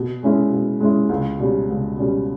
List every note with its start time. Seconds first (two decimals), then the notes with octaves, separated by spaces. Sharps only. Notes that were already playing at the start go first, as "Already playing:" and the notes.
Already playing: B2
0.23 G#3 C#4 E4
0.52 B2
0.80 G#3 C#4 E4
1.09 C#2
1.39 B2 G3 C#4
1.68 C#2
1.97 B2 G3 C#4